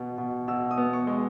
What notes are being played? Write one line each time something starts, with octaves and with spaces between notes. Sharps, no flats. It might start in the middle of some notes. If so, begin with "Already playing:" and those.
Already playing: B2 B3
B2
B2 E6
D#6
B3
C#6
G#3